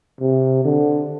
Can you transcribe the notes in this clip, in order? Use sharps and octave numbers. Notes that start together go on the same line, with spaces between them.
C3
D3